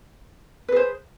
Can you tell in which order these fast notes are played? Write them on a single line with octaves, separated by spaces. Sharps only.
B4 G#4 C5